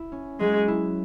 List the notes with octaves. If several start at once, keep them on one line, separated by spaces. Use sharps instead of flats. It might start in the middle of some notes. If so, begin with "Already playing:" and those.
Already playing: E4
C#4
F#3 G#3
E4